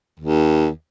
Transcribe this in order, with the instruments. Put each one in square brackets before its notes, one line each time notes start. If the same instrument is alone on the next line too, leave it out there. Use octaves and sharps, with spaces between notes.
[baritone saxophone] D#2